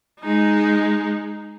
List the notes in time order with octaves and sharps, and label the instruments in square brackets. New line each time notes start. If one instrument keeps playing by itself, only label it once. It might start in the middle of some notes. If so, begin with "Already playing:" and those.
[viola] G#3 D#4